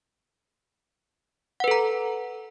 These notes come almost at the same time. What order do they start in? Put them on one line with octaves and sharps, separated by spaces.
F#5 B4 A4 A#5